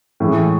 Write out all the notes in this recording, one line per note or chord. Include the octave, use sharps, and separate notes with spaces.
A2 E3 G#3